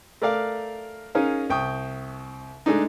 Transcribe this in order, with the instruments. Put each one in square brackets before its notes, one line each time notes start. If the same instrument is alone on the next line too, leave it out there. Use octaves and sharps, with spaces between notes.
[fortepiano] A3 A#4 D5 F5
C#4 D#4 G#4 A#4 F5
C2 G5 C#6 D#6
G#3 A3 D4 D#4